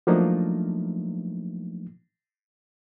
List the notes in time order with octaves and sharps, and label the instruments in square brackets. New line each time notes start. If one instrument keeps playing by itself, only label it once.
[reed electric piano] F3 F#3 A3 A#3 D4 D#4